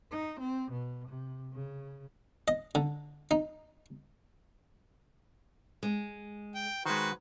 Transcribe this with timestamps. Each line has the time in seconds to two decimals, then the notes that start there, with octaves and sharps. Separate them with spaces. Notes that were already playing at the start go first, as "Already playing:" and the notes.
0.11 D#4
0.40 C4
0.71 B2
1.08 C3
1.52 C#3
2.48 D#5
2.75 D3
3.31 D#4
5.83 G#3
6.55 G5
6.86 D#3 G#3 F#4 B4 C5